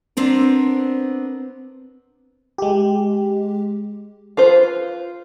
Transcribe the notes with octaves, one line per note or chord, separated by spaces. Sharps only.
B3 C4 D4 A#4
G#3 G4
F4 B4 C5